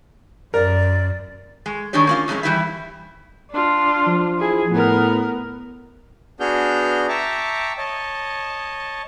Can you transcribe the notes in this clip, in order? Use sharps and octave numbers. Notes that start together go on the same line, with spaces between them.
F#2 A#4 D5
G#3
D#3 G#3 D4 G4 C#5
A#3 C#4 F4
F2 C3 F#3 G#3 C#4
E3 F3 G3 E4 G4 E5
D4 F4
F3
E4 G#4
A2 B3 A#4
B3 D4 F#4 G#4 F6 G6
E5 G5 A5 A#5 C#6 D6
C#5 D#5 A5